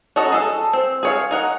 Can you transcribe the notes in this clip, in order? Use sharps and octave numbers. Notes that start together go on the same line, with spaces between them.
C#4 F#4 A4 D#5 A#5
G#4 A4
C4
G#4 C#5 F5
D#4 A#4 F#5